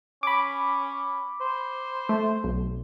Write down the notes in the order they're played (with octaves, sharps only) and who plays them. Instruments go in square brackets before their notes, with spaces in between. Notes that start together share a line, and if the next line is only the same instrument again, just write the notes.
[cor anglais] C#4 [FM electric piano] B5 D6
[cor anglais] C5
[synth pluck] A3
B1